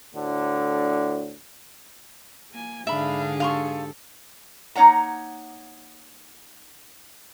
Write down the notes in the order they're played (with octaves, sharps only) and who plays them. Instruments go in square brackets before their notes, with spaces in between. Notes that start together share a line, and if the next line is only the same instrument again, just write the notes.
[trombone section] D2 A2 D3
[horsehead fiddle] A#3 G#5
[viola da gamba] G#2 D3 G#4 [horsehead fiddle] D4 F5 [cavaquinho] E5 B5
[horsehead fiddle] G4 A4 [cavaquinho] F5 C6 C#6
[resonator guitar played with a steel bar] A#3 D#4 C#5 F#5 A#5